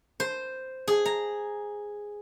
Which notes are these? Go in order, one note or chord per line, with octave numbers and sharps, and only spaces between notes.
C5
G#4
A#5